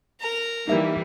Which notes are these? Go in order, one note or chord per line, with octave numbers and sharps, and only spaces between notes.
A#4 A#5
E3 G3 A#3 D#4 E5